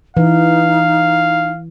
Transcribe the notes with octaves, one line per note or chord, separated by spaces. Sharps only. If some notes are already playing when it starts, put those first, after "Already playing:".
E3 D#4 F5